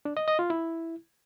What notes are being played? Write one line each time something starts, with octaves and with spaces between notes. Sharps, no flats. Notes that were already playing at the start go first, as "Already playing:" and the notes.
D4
D#5
D#5
F4
E4